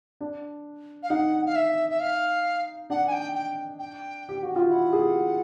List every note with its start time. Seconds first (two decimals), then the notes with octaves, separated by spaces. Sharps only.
0.21 D4
1.03 F5
1.10 D#4 F#5
1.46 F5
1.56 E5
1.90 E5
2.00 F5
2.90 D4 F#5
3.07 G#5
3.12 G5
3.34 G5
3.79 G5
4.29 G4
4.43 F#4
4.56 F4
4.69 E4 F#5
4.92 G#4
4.99 G4